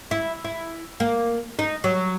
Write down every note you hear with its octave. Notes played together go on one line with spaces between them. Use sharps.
E4
E4
A#3
D#4
F#3